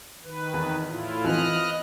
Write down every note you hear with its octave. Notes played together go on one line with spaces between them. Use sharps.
D#3 B4
E2
A2 E4 F4
E3 F3 B3 D#5 F6 F#6